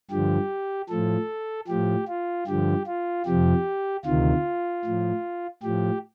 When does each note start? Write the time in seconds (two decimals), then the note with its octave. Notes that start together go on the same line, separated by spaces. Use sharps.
0.11 G2 D3 F3 G4
0.89 A2 F3 A4
1.68 A2 F3 G4
2.08 F4
2.47 G2 D3 F3 G4
2.87 F4
3.26 F2 C3 F3 G4
4.05 D2 C3 D#3 F4
4.85 A2 F3
5.63 A2 F3 G4